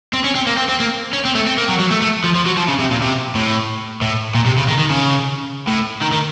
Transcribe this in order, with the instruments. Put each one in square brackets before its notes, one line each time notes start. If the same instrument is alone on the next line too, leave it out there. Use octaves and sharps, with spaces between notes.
[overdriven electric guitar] C4
C#4
C4
A#3
C4
C4
A#3
C#4
C4
A3
C4
A#3
F#3
F#3
A3
A3
F3
F3
F#3
F3
C#3
C3
A#2
C3
A2
A2
A#2
C3
C#3
D#3
D#3
C#3
A2
D#3
D#3